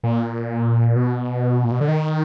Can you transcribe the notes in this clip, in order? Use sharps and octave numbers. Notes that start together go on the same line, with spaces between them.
A#2
B2
A#2
B2
D3
D#3